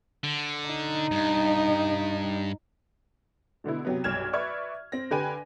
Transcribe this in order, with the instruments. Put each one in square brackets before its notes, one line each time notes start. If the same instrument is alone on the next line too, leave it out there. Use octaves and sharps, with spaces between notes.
[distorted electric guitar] D3
[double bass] D#4
[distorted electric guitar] G2
[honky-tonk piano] B2 D3 B3 E4
C3 F#3 B3
B1 G2 F6 G#6 E7
B4 D5 E5 C#6 F6 G#6
C4 A#6
D3 G4 B4 G5 G#5 D#7